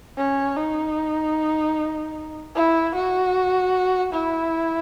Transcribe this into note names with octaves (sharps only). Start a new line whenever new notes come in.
C#4
D#4
E4
F#4
E4